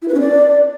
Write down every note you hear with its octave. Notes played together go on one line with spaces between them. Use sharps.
E4
B4
C#4
D5